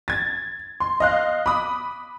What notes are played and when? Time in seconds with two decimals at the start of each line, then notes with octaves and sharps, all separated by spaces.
0.08 G#6 A6
0.80 C6
1.00 D#5 F5 F#6
1.46 B5 D6 D#6